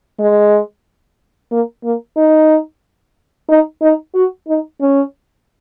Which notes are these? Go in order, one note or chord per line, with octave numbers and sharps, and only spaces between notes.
G#3
A#3
A#3
D#4
D#4
D#4
F#4
D#4
C#4